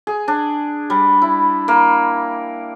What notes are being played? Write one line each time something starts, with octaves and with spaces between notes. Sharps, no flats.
G#4
D4
G3
E4
A#3